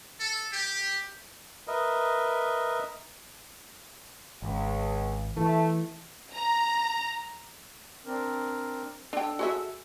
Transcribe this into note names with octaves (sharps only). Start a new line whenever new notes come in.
A4
G4
A#4 B4 D#5 E5
G#1 C#2
E3 A3
A#5
C4 D4 A#4
D4 A4 G5
F#4 G#4 E5